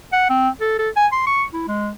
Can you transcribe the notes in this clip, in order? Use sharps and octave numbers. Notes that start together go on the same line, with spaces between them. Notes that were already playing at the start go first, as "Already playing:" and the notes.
F#5
C4
A4
A4
G#5
C6
C#6
E4
G#3